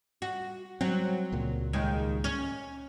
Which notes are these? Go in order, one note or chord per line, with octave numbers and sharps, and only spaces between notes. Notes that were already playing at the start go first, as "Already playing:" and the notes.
F#4
F#3 C4
C#2 A#2
D#2 D#3 G#3
C#4